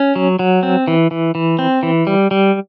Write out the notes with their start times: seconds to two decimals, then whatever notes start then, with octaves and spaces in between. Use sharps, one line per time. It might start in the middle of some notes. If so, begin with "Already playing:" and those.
Already playing: C#4
0.16 F#3
0.39 F#3
0.63 C4
0.88 E3
1.11 E3
1.35 E3
1.59 C4
1.83 E3
2.07 G3
2.31 G3